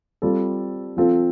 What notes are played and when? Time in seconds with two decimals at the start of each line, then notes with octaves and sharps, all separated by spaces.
0.22 G3 C4 F4 A4
0.97 F3 C4 F4 A4